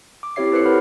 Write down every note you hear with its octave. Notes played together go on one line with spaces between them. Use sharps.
D6
C4 E4 G4 C#5 E5 C7
E4 A4 B4 C5 C7 C#7
G4 A#4 F#5 B5 F6